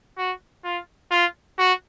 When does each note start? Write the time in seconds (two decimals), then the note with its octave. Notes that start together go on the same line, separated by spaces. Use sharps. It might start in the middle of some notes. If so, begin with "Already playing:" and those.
0.18 F#4
0.64 F4
1.11 F4
1.59 F#4